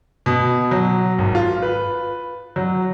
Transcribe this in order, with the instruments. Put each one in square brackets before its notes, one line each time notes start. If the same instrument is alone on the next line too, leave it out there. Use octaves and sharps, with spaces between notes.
[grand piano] B2
F#3
G#1
F4
B4
F#3